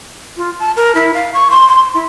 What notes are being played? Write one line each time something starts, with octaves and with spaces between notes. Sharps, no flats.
F4
A5
A#4
E4
F5
C#6
C6
C6
E4